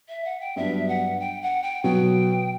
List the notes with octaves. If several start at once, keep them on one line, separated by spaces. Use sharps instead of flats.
E5
F#5
G5
G2 F#3 B3 D4 E5
F#5
G5
F#5
G5
B2 F#3 B3 G5